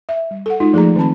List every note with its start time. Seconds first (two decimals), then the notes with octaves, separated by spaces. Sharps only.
0.09 E5
0.31 G3
0.46 A4 F#5
0.60 G#3 D#4 F4 F#4
0.73 F3 A3 G#4 D5 A#5
0.96 D#3 C4 A5 B5